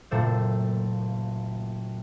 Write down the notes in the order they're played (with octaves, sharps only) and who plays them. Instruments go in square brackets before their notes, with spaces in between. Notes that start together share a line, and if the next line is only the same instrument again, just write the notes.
[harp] F#1 A#2 A3 C5